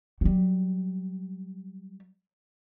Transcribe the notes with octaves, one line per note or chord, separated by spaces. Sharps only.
F#3 G3